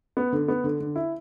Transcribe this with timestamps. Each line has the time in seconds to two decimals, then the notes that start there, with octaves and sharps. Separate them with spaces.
0.17 B3
0.33 D3
0.48 B3
0.64 D3
0.80 D3
0.96 E4